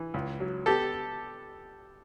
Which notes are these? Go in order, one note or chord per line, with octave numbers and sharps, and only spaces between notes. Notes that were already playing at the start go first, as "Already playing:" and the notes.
Already playing: E3
C#2
F#3
B3 G4 A4